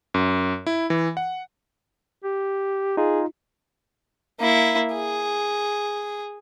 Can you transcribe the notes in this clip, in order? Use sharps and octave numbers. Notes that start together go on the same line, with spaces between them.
F#2
E4
E3
F#5
G4
D#4 F4 G#4
A#3 E4
G#4